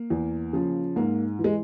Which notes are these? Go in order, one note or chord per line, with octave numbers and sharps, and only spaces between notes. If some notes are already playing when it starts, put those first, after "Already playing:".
Already playing: A#3
E2
C#3 F3
G#2 A#3
E3
G#3